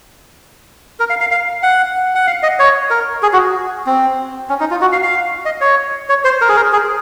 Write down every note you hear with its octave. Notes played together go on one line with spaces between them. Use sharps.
A#4
F5
F5
F5
F#5
F#5
F5
D#5
C#5
A#4
G#4
F#4
C4
C#4
D#4
F4
F#4
F5
F5
D#5
C#5
C#5
C5
A#4
G#4
A#4
G#4